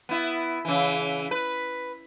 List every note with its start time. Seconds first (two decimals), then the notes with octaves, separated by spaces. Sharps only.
0.09 B3 E4
0.65 C#3 E3
1.31 B4